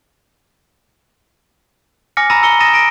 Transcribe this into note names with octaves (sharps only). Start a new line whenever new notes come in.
G#5 D6 F6 A#6 C#7
A#5 B5 E6 A6 A#6 D#7
A#5 E6 C#7 G7
D#6 A6 A#6 D#7 E7
A#6 D7